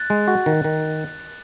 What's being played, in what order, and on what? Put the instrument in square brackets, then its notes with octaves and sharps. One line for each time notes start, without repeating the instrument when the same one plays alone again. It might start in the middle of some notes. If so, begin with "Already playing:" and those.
Already playing: [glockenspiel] F#6 A6
[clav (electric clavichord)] G#3
F#4
D#3
D#3